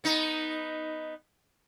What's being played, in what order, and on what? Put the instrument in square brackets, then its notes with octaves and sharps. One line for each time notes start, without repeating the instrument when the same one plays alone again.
[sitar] B3 D#4